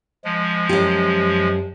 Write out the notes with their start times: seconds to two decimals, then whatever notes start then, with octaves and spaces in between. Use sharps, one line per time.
0.24 F3 G#3
0.69 F#2 G4